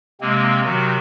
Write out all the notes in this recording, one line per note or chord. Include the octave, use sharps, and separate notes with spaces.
C3 G#3 A#3 C4
C3 D#3 F#3 F#4